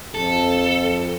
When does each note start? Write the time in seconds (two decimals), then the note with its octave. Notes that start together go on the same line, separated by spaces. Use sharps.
0.14 F2 A4